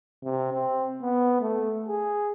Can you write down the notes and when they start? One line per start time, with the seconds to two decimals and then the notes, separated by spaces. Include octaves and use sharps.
0.24 C3
0.53 C4
1.02 B3
1.41 A3
1.88 G#4